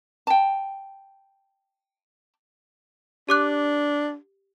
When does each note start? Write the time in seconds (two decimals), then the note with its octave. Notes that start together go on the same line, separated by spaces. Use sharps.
0.27 G5 A5
3.29 D4 G4 D6 F#6